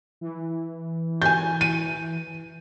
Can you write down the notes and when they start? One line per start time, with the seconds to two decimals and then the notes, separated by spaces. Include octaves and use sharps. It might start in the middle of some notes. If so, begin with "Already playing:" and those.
0.21 E3
1.22 G#5 G6
1.61 D#7